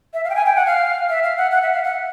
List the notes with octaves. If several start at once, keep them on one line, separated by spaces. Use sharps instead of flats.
E5
F5
G5
G#5
G5
F#5
F5
E5
F5
F#5
F#5
E5
F5
F#5